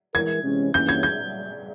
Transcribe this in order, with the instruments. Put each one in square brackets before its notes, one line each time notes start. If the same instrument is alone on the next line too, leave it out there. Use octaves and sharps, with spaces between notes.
[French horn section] E3 G#3 E4 A#4 [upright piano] G#6
[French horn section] C3 E3 G#3 C#4
[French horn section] G2 E3 A#3 C#4 [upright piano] G6
[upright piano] G#6
G6